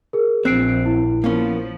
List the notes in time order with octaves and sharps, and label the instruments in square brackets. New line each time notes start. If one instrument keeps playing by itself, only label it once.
[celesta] G#4 A#4
[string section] A#1 [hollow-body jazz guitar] C4 [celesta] F#6 C7 D7
[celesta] E4
[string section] F3 [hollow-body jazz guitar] A#3 B3 C#4